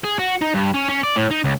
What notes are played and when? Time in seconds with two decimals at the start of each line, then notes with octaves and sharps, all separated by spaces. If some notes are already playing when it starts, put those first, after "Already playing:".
0.04 G#4
0.19 F#4
0.41 D#4
0.54 G2
0.74 C#4
0.89 C#4
1.03 D5
1.16 A2
1.31 D#4
1.44 C#2